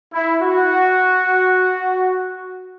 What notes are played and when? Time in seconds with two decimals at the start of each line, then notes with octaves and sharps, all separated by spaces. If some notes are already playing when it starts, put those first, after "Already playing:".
0.13 E4
0.42 F#4